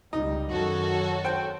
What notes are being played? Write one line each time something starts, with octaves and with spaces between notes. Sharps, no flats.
C#2 G3 D#4
F#2 D#3 F#4 A4 C#5
C5 G5